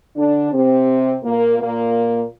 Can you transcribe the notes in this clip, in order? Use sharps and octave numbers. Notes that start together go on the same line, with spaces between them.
D3 D4
C3 C4
A#2 A#3
A#2 A#3